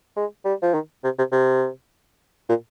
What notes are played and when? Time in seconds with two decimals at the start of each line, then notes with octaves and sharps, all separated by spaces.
0.16 G#3
0.45 G3
0.62 F3
0.74 D#3
1.04 C3
1.18 C3
1.32 C3
2.49 A#2